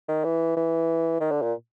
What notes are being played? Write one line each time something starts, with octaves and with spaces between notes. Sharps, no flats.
D#3
E3
E3
D#3
D3
A#2